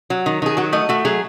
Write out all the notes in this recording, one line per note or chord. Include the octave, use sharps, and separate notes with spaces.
F#3
D#3
D#3 G#4
F#3 F#4
A3 D#5
A3 F#4
F#3 G#4